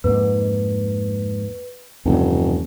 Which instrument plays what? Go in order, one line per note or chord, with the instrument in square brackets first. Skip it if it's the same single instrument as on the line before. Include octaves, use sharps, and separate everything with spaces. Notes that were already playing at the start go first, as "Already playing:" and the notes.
[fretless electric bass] F2 G#2 A#3 [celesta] B4
[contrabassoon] F1 [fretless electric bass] E2 G2 C#3